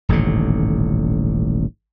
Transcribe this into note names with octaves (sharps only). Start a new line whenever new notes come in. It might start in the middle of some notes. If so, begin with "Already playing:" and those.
D#1 A1 G#2 D3